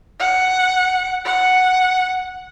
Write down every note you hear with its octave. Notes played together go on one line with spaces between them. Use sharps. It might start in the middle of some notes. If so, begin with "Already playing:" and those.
F#5
F#5